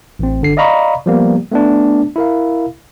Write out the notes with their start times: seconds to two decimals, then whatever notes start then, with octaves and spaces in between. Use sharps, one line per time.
0.19 A1 C4
0.42 G1 D3 C7
0.57 D5 D#5 F5 A#5 B5 C#6
1.06 F3 G3 A#3 B3
1.52 A3 B3 D4
2.16 E4 A#4 F5